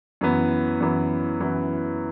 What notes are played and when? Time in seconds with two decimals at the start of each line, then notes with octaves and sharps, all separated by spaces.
0.21 F#2 E3 B3
0.80 F#2 E3 B3
1.40 F#2 E3 B3